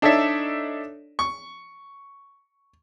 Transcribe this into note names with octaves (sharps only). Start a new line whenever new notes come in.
D4 D#4 A4 C#5 D5 E5
C#6